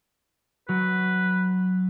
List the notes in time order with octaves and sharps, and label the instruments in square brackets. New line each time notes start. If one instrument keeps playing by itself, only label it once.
[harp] F#3 [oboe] B4